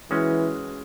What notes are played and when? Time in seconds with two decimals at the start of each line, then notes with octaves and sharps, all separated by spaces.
0.11 E3 G#3 C#4 F#4